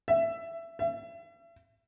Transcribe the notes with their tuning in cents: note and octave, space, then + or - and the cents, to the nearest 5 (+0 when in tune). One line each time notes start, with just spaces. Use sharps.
E5 +15
E5 +35